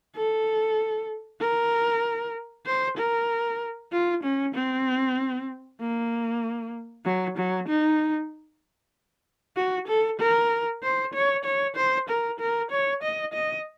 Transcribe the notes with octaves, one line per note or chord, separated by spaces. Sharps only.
A4
A#4
C5
A#4
F4
C#4
C4
A#3
F#3
F#3
D#4
F#4
A4
A#4
C5
C#5
C#5
C5
A#4
A#4
C#5
D#5
D#5